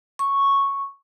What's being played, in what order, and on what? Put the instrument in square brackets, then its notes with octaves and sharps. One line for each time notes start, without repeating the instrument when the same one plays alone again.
[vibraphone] C#6